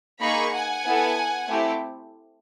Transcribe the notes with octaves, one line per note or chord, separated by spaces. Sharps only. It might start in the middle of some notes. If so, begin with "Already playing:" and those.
A#3 D#4 G#4 B5 C#6
F#5 G#5
B3 E4 A4
A3 C4 E4 G4